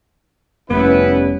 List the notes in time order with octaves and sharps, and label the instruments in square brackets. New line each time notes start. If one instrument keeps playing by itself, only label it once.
[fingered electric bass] F1 [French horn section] G3 C#4 [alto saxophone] B3 [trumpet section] E4 B4